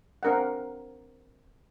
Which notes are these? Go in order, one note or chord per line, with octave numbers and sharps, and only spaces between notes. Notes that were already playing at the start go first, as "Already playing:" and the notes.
C4 D4 A#4 F5 F#5